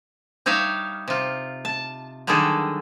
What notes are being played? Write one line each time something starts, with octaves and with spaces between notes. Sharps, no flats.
G3 D#4 C#5 E5 F5
C3 F4
A5
D3 D#3 F#3 G3 G#4 A4